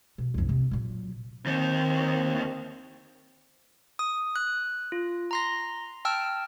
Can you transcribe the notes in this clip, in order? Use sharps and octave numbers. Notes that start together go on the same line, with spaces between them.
B2
C2 F2
C3 C4
A#2 F#3
D#2 D#3 C4
D#6
F#6
F4
A#5 C6 A#6
G5 A5 E6 F6